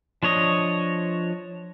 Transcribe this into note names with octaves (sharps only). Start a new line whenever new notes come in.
F3 D4 C#5 D#5